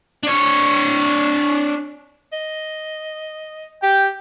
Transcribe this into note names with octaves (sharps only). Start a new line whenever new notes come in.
D4 C#5
D#5
G4 G5